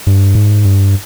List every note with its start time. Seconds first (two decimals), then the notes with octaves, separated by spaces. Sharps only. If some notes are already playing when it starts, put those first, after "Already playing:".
0.07 G2
0.35 G#2
0.65 G2